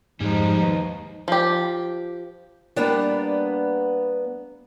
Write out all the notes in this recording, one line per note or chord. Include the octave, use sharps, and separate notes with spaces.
F2 G#2 F3 G3 G#3 D#4 G#4
D#2 B4 D#5
F3 G4
G3 A#3 B3 D4